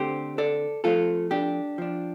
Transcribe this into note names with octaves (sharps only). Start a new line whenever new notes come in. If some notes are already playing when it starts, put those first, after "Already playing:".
Already playing: D3 A3 C4 G4 C5
A4 D5
F3 A3 C4 F4 A4
D4 G4
F3 D4